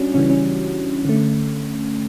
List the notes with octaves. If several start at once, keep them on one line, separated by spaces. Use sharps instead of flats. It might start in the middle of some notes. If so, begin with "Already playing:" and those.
Already playing: G3 C#4 D4 F#4
C#3 E3 G3 C#4
C#4
D3 A3